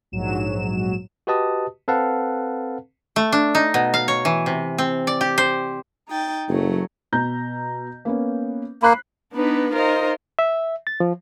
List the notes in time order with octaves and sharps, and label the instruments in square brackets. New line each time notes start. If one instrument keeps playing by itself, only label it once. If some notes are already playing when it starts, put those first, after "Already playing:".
[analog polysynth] A#1 G#2 F#3 E7
[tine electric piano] F#4 G4 B4 D#5 A5 D#6
C4 A4 B4 F5 F#5 A5
[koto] A3
D4
D#4
B2
F5
C#5
E3
C3
C4
D5
G4
C5
[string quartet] D#4 G5 A6
[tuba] F#1 [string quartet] F#3 A3
[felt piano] B2 A#5 G6
A#3 B3 C#4
[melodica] A#3 [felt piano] B5 F#6 C7
[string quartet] B3 D4 D#4 B4
D#4 F4 A#4 C5 D#5
[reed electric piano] E5
A6
F3